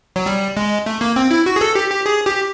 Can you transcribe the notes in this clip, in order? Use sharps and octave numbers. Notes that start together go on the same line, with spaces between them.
F#3
G3
G#3
A3
A#3
C4
E4
F#4
G#4
A4
G4
G4
G#4
G4